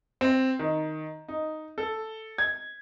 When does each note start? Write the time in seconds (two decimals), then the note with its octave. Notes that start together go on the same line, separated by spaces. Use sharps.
0.21 C4
0.59 D#3
1.28 D#4
1.78 A4
2.38 G#6